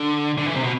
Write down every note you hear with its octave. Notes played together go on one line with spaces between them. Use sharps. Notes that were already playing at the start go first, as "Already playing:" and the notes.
Already playing: D3
D3
E3
C3
B2